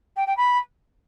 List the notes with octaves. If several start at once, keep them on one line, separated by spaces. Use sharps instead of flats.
G5
G5
B5